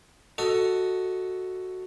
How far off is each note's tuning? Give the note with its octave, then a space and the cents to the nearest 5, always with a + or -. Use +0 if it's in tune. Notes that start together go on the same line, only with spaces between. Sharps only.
F#4 +0 A4 +10 D#5 +15